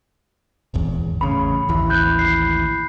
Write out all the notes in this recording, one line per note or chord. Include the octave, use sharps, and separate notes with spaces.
D#1 G#1 E2
A1 C#3 B5
A1 D#2 E3
B5 F#6 G6
C7